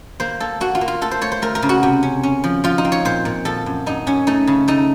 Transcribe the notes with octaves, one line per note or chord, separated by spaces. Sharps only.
A#3 C5
A#3 A4
A#3 F#4
F4
A#3
F4
A3 A4
C5
A3 C#5
C5
A3 A#4
A#4
C#3
F#4
C3
C#4
C#4
F3
F3 F4
D#4
C4
C#5
A#2 C5
A#2
F3 A4
F#2
F#2 D#4
F#2 C#4
A3 D#4
C#3
A3 D#4